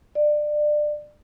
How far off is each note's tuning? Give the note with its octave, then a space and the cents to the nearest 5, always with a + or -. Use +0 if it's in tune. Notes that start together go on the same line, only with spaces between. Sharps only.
D5 +25